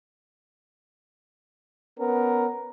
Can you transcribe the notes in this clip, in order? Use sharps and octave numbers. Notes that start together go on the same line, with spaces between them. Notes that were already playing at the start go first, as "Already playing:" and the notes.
B3 C#4 A#4